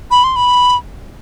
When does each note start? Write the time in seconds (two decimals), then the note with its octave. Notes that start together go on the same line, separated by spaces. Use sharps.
0.11 B5
0.24 C6
0.36 B5